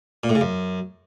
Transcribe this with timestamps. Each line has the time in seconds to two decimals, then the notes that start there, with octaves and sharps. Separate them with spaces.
0.24 A#2
0.29 A2
0.35 C#3
0.41 F#2